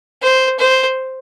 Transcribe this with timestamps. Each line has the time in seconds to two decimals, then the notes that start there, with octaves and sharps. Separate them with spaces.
0.22 C5
0.59 C5